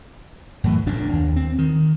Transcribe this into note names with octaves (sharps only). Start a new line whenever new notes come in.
F#2 A2 E3
F1 F#2 A2 D4
D#2
C4
D#3